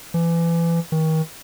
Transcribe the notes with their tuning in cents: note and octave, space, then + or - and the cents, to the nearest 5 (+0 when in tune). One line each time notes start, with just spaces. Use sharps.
E3 +30
D#3 +35